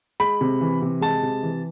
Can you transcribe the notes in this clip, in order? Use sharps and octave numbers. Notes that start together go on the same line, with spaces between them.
G#3 B5
C3
E3
C3
G#3 A5
C3
E3